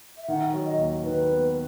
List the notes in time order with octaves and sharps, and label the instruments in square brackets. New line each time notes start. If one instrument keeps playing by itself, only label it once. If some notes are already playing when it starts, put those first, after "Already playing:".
[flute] E5
[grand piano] D#3 [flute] F#5
[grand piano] F#3
[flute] D#5
[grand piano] D#2
[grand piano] D#3 [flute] B4
[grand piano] B3